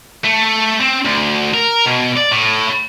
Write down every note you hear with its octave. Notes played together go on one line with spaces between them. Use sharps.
A3
C4
D2
A#4
B2
D5
A2